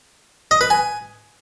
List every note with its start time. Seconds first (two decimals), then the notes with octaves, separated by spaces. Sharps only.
0.51 D#5
0.61 B4
0.70 G#5